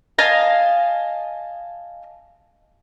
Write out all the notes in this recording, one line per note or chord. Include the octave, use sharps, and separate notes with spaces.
D#5 F5 G#5 A5